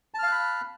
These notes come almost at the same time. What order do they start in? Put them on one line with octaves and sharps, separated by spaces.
A5 F6 F5 F#6 B5